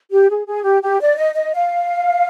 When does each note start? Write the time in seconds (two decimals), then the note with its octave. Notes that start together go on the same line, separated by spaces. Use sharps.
0.12 G4
0.30 G#4
0.47 G#4
0.64 G4
0.83 G4
1.01 D5
1.17 D#5
1.35 D#5
1.54 F5